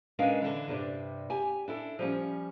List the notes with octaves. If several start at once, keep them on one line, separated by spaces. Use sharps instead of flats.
G#3 C#4 D4 A#4 B4 F5
D3 E3
G2 C3 G3 D4
G4 G#5
D4 E4 A4
F3 G3 C#4